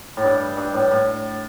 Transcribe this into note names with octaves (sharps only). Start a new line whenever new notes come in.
A2
G2
G2
A2
A2